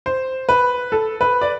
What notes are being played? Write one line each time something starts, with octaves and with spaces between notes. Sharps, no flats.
C5
B4
A4
B4
D5